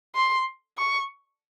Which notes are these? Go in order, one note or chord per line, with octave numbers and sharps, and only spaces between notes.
C6
C#6